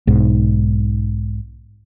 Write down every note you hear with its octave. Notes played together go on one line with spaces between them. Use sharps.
B1 G#2